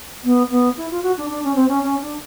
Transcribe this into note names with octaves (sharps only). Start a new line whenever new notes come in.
B3
B3
E4
F4
F#4
D4
D4
C#4
C4
C#4
C#4
D4